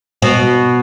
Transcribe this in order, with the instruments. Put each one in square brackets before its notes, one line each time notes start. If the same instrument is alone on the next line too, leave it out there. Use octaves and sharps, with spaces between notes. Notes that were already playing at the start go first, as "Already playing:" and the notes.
[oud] B2